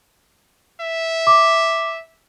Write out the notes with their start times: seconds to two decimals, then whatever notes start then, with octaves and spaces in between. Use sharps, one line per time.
0.81 E5
1.27 D6